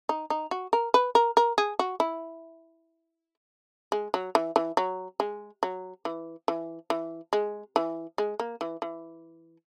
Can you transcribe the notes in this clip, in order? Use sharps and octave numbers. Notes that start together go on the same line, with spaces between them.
D#4
D#4
F#4
A#4
B4
A#4
A#4
G#4
F#4
E4
G#3
F#3
E3
E3
F#3
G#3
F#3
E3
E3
E3
G#3
E3
G#3
A#3
E3
E3